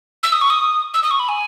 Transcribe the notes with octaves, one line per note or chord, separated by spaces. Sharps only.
E6
D#6
C#6
D#6
E6
D#6
C#6
B5
G#5